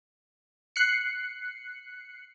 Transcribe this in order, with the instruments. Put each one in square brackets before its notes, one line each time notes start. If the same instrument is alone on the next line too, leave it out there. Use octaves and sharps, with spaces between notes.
[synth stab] F#6 C7 C#7